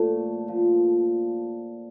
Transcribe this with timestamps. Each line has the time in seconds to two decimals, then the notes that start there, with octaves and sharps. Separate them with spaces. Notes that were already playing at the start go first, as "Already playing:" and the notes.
Already playing: A#2 F3 A3
0.48 A#2 F3